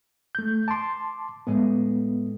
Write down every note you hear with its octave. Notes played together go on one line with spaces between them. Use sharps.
A3 G6
A5 C6 D6
A2 G#3 B3